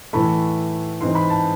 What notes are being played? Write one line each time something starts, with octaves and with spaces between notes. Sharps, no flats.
A2 E3 A3 B5
G#2 E3 G#3 C4 C6
B5
A5